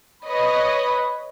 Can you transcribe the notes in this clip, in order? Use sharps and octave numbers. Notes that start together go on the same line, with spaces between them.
B4 C#5 D#5 B5